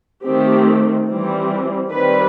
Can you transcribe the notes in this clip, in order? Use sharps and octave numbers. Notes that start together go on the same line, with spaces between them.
D#3 A3 C4 G4
E3 G3 C4
D#3 G3 C4 B4